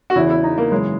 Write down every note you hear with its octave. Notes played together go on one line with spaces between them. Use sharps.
F#4
E2 C#3 E3 E4
E4
D#4
A#3
F#2 C#3 E3 G#3